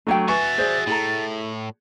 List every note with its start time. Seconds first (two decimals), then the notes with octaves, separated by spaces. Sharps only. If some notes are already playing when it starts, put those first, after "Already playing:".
0.07 F#3 A3 D4 C#5 G5
0.28 F#4 B4 E5 G#5 C#6 A6
0.58 G#4 C5 D5
0.87 A2 E4 A4 A#5